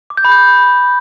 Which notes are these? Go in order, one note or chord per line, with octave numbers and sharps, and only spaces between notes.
D6
G6
B5
G6